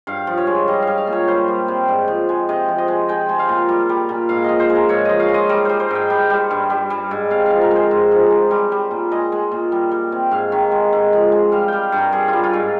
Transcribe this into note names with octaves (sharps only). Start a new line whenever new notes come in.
G2 F5
F3
C#5
G#3
G3 D#5
G3 F5
F5
A#2
C#5
G3 C5
G3
C3
G#2
F3
G#3
C3 D#5
F3
D#5
G#3
G#3 G5
G#3
F5
A#2
G3
G3
A#2
G#2 F5
F3 D#5
C5
G#3
A#4
G#2 C#5
F3 D#5
F5
G#3
D#5
G3
G3 C5
C5
G#2 G5
G3
G3
G2
G3
G3
G#2
C3 F5
F3 F5
A#4
G#3 C5
G#2
F3
G#3
G3
G3
A#2
G#3 D#5
G#3
A#2
G3
G3
C3
G#2 F5
D#3
G#3
G#2
F3
G#3
G3 F5
G3 G5
G2
A#4
G3 G#4
G3 F4
F4
G#2